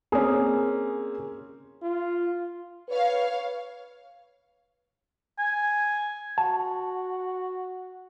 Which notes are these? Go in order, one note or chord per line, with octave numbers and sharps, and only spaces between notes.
A#3 C4 C#4 G#4
F4
B4 C#5 F5
G#5
F#4 A5